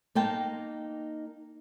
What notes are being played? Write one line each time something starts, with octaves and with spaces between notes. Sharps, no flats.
A#3 D#4 G5 A5